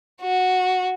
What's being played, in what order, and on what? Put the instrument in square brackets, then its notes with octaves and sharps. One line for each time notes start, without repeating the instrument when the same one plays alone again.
[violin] F#4